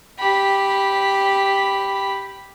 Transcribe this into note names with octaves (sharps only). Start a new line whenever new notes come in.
G4 B5